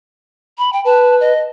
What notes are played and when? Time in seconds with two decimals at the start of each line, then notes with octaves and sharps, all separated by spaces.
0.58 B5
0.73 G5
0.85 B4 A5
1.20 D#5